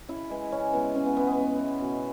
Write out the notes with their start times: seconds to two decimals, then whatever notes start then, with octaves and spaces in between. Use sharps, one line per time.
0.09 C#3 E4
0.30 E3 G#3
0.52 C#3 C#4
0.73 E3 G#3 B3
0.95 C#3 C#4
1.06 B3
1.16 E3 G#3 B3
1.27 B3
1.38 C#3
1.59 E3 G#3
1.81 B2